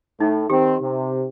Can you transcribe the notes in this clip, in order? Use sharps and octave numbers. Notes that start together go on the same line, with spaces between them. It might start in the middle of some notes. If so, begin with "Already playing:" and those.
A2 A3 D#4
D#3 C4 G4
C3